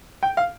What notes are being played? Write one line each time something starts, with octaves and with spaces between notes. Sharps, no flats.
G5
F5